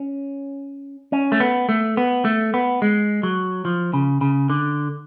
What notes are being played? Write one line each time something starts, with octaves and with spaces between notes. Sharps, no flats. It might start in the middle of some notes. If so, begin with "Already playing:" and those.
Already playing: C#4
C#4
A3
B3
A3
B3
A3
B3
G#3
F#3
F3
C#3
C#3
D3